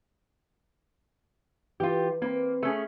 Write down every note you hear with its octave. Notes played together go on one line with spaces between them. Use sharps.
E3 F4 G4
A#3 C4 A#4 B4
A3 C#4 G#4